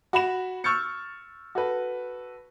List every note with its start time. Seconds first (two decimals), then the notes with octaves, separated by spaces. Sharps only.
0.13 F#4 B5 E7
0.64 C#6 E6 F6 G6 A6 C#7
1.55 F#4 A4 B4